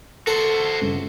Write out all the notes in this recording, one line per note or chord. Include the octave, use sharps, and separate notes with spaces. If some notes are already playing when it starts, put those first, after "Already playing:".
F#4 A4 C5
G1 G2 C#3